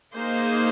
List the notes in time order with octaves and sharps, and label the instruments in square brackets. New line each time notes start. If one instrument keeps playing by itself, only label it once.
[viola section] A#3 D#4 G#4 C5